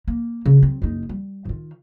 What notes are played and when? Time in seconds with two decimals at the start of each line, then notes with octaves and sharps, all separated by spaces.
0.08 A#3
0.46 C#3
0.62 F#3 C4
0.82 F#1 D#4
1.09 G3
1.45 D#3 F4